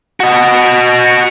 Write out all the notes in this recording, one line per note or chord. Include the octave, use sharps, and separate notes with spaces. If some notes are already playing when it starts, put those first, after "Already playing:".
F#4 D#5